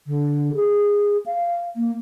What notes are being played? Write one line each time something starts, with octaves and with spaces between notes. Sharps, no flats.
D3
G#4
F5
A#3